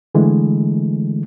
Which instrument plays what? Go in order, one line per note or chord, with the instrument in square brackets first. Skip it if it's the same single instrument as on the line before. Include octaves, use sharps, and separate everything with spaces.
[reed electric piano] D3 E3 G#3 A3